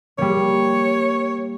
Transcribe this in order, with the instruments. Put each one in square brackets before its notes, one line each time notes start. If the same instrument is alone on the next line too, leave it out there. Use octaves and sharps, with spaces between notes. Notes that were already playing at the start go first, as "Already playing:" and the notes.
[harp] G3 A#3 [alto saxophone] C#5